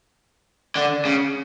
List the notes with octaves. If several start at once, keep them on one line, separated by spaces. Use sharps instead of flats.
D3
C#3